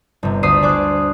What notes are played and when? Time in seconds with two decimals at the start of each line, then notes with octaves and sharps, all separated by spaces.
0.23 G1 C3
0.43 D2 D4 C5 D#6 B6 C7
0.62 G#4 C5 D5 D6 F#6